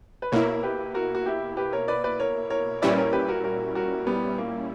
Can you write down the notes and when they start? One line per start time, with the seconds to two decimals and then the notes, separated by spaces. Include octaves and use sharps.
0.22 B4
0.32 B2 A#3 E4 A#4 C#5
0.63 G4 B4
0.94 F#4 A#4
1.15 F#4
1.26 E4 G4
1.57 G4 B4
1.73 A#4 C#5
1.88 B4 D5
2.04 B4 D5
2.20 A#4 C#5
2.50 A#4 C#5
2.82 A#2 G3 C#4 E4 B4 D5
2.97 A#4 C#5
3.13 G4 B4
3.28 F#4 A#4
3.44 F#4 A#4
3.75 F#4 A#4
4.07 G3 B3
4.38 A#3